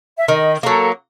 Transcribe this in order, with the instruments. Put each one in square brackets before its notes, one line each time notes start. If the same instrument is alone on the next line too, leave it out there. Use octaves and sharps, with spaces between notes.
[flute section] E5
[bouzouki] D#3 [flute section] D#5
[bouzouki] F#3 A#3 [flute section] A4